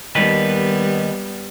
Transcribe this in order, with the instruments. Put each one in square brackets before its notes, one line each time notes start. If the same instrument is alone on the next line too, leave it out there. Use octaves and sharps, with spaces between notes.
[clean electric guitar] D#2 D#3 B4 [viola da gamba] G3 B3